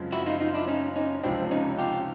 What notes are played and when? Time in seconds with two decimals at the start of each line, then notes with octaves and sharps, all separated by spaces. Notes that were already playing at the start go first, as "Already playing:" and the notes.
Already playing: F#2 C#3 F3 G#3 C4
0.12 E4 F#4
0.26 D#4 F4
0.40 D#4 F4
0.54 D4 E4
0.67 C#4 D#4
0.96 C#4 D#4
1.23 C#2 C3 F3 C4 D4
1.51 C#4 D#4
1.78 F4 G4